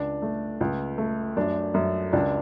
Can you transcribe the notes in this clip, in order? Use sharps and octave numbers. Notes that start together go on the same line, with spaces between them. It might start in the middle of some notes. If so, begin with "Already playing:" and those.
Already playing: C#2 D4
A3
C#2
A3
F#2 D4
F#2
C#2 D4